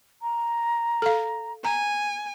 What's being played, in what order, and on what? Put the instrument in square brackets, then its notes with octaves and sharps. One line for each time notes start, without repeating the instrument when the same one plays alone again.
[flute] A#5
[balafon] A4 F5
[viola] G#5 [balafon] A#5